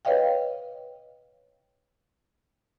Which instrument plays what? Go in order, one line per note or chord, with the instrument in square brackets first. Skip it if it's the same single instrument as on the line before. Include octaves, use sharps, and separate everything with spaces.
[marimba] B4 C#5 D#5 F5 G5